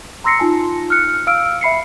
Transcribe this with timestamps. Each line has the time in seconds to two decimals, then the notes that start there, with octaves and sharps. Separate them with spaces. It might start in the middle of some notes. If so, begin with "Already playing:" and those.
0.24 A#5 C6 E6 A#6 C7 C#7
0.39 D#4 F4 G#5 A5
0.90 F6 F#6 C#7
1.27 F5 E6 F6 D7
1.61 E5 B5 C7 C#7